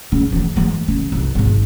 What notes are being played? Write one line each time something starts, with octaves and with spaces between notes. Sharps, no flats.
C#3
E3 G#3
E3 G#3
C#3
C2
G#1 C#2